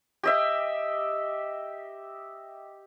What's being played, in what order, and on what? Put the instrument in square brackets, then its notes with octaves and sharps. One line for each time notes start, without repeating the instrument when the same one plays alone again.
[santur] G4 D#5 E5